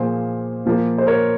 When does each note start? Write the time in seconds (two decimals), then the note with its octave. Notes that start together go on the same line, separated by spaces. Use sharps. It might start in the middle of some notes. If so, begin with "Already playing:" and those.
Already playing: A#2 F3 A#3 G#4 C5
0.66 A#2 F3 A#3
0.98 C5
1.07 A#4 C#5